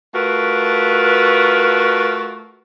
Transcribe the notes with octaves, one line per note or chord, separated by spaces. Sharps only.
A3 F4 F#4 A#4 B4